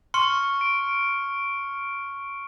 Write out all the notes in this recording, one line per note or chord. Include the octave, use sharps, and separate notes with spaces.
C6 C#6 F6 C#7
D7